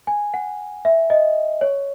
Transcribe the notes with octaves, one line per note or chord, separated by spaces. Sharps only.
G#5
F#5
E5
D#5
C#5